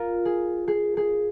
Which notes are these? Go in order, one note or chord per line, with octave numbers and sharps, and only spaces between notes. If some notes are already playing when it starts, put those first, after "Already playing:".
Already playing: F4 A#4
G#4
G#4
G#4